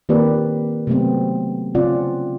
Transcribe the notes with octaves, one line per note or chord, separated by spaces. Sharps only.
D#3 A#3 C4 G4 B4 D5
C3 F#3 A3 B3 C4
C#3 C4 C#4 F4 D5 F#5